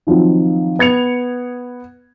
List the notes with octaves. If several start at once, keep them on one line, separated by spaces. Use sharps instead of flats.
D#3 F3 F#3 C4
B3 G#6 C#7 F7